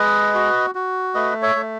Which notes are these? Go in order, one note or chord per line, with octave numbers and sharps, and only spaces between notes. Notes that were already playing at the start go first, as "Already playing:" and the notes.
Already playing: G#3 B4 D#5
F#4
F#4
A3 B4 D#5
C#5 E5
A3